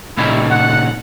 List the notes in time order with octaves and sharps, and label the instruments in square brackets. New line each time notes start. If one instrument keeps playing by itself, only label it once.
[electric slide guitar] A#2 C#3 D#4 [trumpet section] G3 E4
[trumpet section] F#5